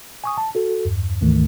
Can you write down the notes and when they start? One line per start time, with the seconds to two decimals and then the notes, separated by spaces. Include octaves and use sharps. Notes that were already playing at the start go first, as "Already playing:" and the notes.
0.24 G#5 C#6 D#6
0.38 A5
0.55 F#4 A4
0.85 E2 G2
1.21 D2 G#2 D#3 E3 A3